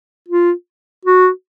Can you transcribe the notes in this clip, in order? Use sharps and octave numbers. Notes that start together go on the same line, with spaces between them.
F4
F#4